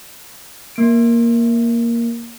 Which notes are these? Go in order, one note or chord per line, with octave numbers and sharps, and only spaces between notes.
A#3 D7